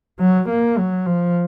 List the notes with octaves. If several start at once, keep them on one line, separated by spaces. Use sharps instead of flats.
F#3
A#3
F#3
F3